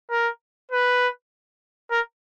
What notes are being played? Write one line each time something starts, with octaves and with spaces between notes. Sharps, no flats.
A#4
B4
A#4